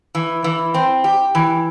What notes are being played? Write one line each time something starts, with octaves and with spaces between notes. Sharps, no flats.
E3
E3
C4
G4
E3